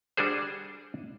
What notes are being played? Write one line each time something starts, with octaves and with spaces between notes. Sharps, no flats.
G3 D4 F#4 G#4 C5